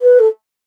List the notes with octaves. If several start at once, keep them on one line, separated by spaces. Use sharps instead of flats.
B4
A4